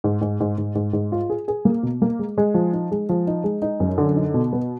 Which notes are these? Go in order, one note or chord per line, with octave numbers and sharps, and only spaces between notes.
G#2
G#2
G#2
G#2
G#2
G#2
F4
G#4
G#4
A#3
B2
A#3
G#3
G#3
F3
D#4
G#3
F3
D#4
G#3
D#4
F#2
D3
D#4
B2
B3